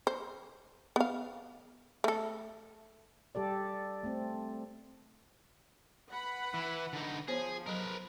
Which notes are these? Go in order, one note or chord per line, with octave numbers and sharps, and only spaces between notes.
C5
B3 F5
A3 A4
G3 G4 A4 D5
A3 C4
B4 F#5 B5
E3
D3 D#4
F3 B3 G#4 C5 C#5
F#3 A#4 B4 A#5